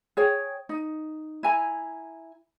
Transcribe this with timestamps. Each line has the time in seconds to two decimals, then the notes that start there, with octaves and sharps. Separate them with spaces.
0.17 G#4 C#5 G5
0.69 D#4
1.43 E4 G#5 A#5